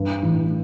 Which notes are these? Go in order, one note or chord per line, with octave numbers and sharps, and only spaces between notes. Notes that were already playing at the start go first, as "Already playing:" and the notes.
Already playing: G2
A1